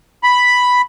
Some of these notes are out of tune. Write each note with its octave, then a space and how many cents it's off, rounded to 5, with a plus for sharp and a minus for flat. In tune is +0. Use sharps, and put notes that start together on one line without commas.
B5 +0